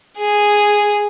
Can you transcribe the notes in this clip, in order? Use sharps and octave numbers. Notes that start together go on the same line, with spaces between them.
G#4